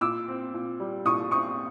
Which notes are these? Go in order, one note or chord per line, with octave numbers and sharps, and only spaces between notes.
A#2 D6 E6
C4
A#2
G3
A#2 C#6 D#6
C4 C#6 D#6